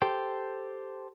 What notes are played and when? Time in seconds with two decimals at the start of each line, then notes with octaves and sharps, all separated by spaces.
0.02 G4 A4 C5 G5